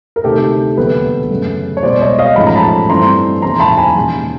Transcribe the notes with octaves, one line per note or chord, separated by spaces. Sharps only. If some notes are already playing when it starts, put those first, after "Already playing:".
A#4
D2 C3 D#3 G4 A4
E1 D#2 D3 F#3 B3 A4 B4
F#2 C#3 F#3 A3
C#5
C2 B2 G#3 C5 D5
C#5 D#5
D#5 F5
A1 G#2 F3 A3 C#4 B5
A#5
A5 B5
G2 E3 A3 C4 A#5 C6
F1 D#2 C#3 E3 A#5 C6
A5 B5
G#5 A#5
E1 D#2 C#3